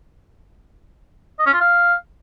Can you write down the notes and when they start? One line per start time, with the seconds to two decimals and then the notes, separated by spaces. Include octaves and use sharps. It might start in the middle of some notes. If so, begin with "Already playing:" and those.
1.39 D#5
1.46 C#4
1.53 F4
1.60 F5